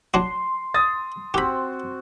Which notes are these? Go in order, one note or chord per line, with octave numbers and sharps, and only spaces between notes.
F#3 D4 F#4 C6
D#6 A6
C4 F#4 G4 B5